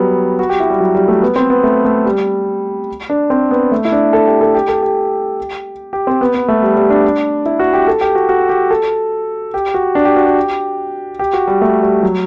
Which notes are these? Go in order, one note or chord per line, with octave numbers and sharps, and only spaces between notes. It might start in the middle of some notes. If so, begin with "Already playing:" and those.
Already playing: F#3 G3 B3
F#4
G4
E4
G3
F#3
G3
A3
B3
C4
B3
A3
A3
G3
D4
C4
B3
A3
E4
D4
A4
G4
A4
G4
A4
G4
G4
C4
B3
B3
A3
G3
G3
D4
E4
F#4
G4
A4
G4
F#4
F#4
G4
A4
G4
F#4
D4
G4
F#4
G4
G4
F#4
G3
A3
G3
F#3